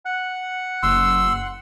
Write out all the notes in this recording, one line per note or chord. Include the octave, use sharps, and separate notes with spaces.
F#5 F#6
F#1 C6 E6